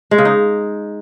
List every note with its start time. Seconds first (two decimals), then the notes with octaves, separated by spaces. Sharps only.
0.11 G#3
0.18 C#3
0.25 D#4